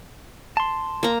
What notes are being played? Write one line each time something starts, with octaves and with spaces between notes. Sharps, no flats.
A5 C6
A#3 A#5